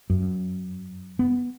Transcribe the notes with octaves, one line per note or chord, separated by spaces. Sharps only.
F#2
B3